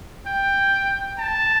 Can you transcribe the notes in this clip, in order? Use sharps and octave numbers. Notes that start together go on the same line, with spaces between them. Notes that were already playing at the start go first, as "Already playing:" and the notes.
G5
A5